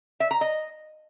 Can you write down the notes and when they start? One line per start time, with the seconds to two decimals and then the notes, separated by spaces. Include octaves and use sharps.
0.20 E5
0.31 A#5
0.41 D#5